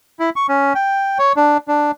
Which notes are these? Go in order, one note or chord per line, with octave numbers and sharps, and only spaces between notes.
E4
C#6
C#4
G5
C#5
D4
D4